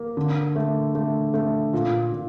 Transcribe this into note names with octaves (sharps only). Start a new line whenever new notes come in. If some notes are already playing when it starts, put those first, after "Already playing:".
Already playing: A#3
D3
A3
A3
A3
A#2
A#2